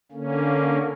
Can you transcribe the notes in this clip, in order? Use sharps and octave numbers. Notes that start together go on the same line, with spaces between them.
D3 A#3 C#4